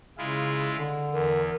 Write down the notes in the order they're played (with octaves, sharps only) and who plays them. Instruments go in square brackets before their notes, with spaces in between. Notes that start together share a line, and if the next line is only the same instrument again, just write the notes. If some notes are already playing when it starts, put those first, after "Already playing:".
[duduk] C#3 [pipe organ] G#3 E4 F4
[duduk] D3
[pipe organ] E2 [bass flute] A#4